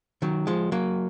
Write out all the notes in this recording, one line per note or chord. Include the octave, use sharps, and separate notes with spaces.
D#3 F#3
F3 G#3
F#3 A#3